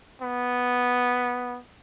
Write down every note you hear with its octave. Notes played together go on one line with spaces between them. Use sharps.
B3